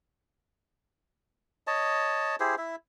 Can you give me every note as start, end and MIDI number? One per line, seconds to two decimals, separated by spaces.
1.67 2.36 73
1.67 2.36 75
1.67 2.36 81
2.40 2.55 64
2.40 2.55 67
2.40 2.55 68
2.40 2.55 72
2.58 2.76 64
2.58 2.76 76